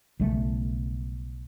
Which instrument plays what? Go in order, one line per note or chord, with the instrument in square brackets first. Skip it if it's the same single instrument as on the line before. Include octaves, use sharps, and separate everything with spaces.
[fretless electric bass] B1 C#3 G3 A3